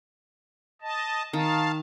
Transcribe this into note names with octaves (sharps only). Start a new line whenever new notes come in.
D#5 A5
D#3 F5 A5